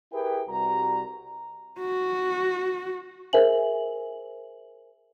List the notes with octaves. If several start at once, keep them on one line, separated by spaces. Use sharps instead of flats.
E4 G4 G#4 A#4 B4 G5
C2 G3 F#4 A#5
F#4
G#4 A#4 C5 E5 G#5 F#7